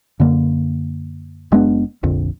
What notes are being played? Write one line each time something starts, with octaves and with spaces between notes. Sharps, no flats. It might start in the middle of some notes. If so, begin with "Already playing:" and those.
F#2 D3 A#3
F#1 G#3 B3 D4
F1 A#1 F2 D3